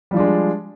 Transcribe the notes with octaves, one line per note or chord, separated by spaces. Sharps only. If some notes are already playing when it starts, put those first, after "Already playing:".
F3 G3 G#3 D4